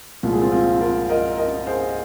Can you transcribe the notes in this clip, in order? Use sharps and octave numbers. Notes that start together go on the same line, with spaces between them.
C2 A#2 F3 G#3 F4
G#4
C4 F4
C4 F4
F4 A#4
A#4 D#5
A#4 D#5
G#4 C5